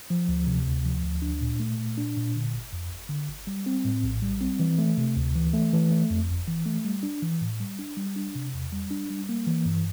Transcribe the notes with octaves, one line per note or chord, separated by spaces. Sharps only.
F3
D2
C3
D2
F3
D2
D4
A#2
A3
A#2
D4
A#2
D3
G1
F2
G1
D3
G1
G3
C4
A2
A#1
G3
C4
E3
A3
C3
D2
E3
A3
E3
A3
F2
G1
E3
A3
G3
D4
E3
A2
G3
D4
G3
D4
C3
E2
G3
D4
G3
A#3
E3
G2